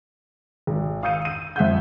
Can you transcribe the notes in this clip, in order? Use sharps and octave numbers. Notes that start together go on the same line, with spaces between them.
G#1
F5 D#6 E6 G6 C#7 D#7
D#7
F2 E5 F#5 G6